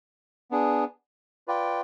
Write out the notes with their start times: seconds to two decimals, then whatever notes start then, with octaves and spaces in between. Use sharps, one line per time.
0.51 B3 D4 G#4
1.48 F4 B4 D5 G5